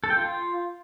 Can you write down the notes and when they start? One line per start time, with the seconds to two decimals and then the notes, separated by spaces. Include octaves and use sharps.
0.04 A4
0.10 G5
0.17 F4